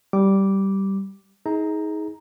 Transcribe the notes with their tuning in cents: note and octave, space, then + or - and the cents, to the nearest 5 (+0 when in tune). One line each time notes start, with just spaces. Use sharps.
G3 -10 D6 -5
D#4 +35 G#4 +10 A#5 +0